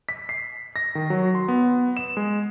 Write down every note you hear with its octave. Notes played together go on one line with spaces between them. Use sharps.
B6
C7
A#6
D#3
F#3
C6
B3
E7
G#3